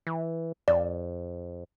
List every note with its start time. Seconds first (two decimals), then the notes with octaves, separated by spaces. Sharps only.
0.07 E3
0.68 F2 D5